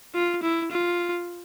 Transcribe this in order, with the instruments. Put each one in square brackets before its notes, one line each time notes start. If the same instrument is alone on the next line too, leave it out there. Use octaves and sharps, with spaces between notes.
[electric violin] F4
E4
F4